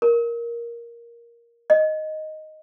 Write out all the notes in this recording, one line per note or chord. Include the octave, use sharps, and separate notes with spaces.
A#4
D#5